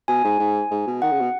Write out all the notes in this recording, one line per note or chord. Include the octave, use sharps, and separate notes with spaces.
B2 G#5
G#2
G#2
G#2
B2
D#3 F#5
C#3
B2